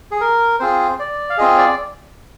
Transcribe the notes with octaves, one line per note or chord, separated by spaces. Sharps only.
G#4
A#4
C4 F4 G#4 C5
D5
F5
C4 F4 G#4 D#5
D5